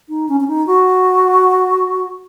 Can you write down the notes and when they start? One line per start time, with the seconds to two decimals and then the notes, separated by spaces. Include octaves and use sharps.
0.09 D#4
0.29 C#4
0.40 C#4
0.48 D#4
0.67 F#4